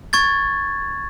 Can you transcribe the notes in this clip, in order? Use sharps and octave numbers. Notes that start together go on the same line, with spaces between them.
C#6 G#6 A6